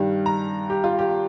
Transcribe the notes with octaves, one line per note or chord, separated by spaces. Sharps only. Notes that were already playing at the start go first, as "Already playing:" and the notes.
Already playing: G2 D#3 G3
A#5
G4
F4
G4